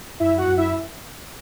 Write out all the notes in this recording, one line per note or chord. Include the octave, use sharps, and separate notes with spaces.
F#2 E4 E5
F#4 F#5
F#2
E4 E5